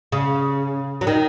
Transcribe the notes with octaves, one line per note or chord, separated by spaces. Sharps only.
C#3
F#3
D#3